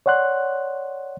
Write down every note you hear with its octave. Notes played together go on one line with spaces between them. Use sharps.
C#5 D5 F#5 C6 F#6